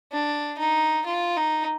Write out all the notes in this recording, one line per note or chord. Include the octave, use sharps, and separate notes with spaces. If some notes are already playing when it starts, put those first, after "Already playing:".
D4
D#4
F4
D#4